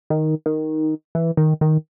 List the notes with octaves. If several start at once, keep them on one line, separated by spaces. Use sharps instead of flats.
D#3
D#3
E3
D#3
D#3